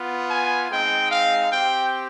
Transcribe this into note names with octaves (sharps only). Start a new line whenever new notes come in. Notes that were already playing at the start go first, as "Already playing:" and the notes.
Already playing: B3 F4
G#5
G#3 C4 D#4 G5
F5
C4 G4 G5